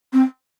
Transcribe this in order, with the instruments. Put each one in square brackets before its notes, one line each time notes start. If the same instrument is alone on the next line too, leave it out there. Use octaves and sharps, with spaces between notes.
[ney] C4